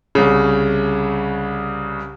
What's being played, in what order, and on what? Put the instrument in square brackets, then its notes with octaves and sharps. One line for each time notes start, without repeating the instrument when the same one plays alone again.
[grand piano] C2 C#3